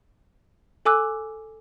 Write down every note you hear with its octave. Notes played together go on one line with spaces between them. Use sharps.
A4 G#5 D6 E6 F#6